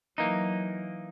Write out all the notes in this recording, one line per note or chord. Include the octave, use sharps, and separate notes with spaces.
E3 F#3 A#3 D#4